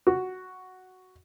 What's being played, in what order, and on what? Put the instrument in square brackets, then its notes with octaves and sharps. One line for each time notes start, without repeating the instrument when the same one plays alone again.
[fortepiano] F#4